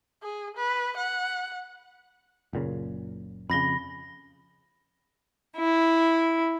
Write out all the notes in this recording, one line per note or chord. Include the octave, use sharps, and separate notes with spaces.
G#4
B4
F#5
F#1 A#2 C#3
F2 C#3 B5 A#6 G7
E4